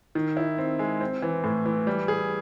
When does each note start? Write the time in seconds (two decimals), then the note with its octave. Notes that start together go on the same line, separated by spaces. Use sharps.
0.15 D#3
0.37 E4
0.58 C4
0.79 G#3
1.00 C4
1.22 E3
1.44 A2
1.66 E3
1.87 G3
2.08 G#4